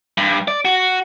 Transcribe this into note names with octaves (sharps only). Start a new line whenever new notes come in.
G2
D5
F#4